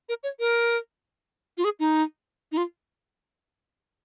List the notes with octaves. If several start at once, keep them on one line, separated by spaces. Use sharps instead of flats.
A#4
C#5
A#4
F4
G#4
D#4
D#4
F4